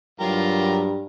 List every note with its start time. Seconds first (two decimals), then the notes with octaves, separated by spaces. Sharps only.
0.20 G2 F#3 F4 G4 A#4